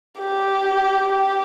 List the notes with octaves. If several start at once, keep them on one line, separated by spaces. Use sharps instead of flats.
G4
G4